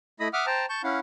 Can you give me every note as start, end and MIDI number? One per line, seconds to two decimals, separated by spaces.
0.20 0.28 57
0.20 0.28 64
0.20 0.28 75
0.20 0.28 83
0.20 0.28 87
0.33 0.46 76
0.33 0.46 78
0.33 0.46 86
0.33 0.46 87
0.33 0.46 89
0.47 0.66 72
0.47 0.66 79
0.47 0.66 81
0.47 0.66 82
0.69 0.82 81
0.69 0.82 85
0.69 0.82 91
0.84 1.00 61
0.84 1.00 64
0.84 1.00 77
0.84 1.00 78